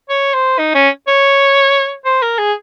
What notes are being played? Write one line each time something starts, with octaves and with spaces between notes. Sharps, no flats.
C#5
C5
D#4
C#4
C#5
C5
A#4
G#4